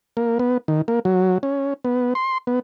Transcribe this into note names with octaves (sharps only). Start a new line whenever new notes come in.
A#3
B3
D#3
A#3
F#3
C#4
B3
C6
B3